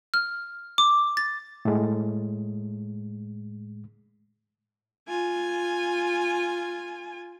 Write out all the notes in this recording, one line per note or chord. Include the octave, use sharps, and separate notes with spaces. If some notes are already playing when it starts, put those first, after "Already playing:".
F6
D6
A6
A2 G#3
F4 G#5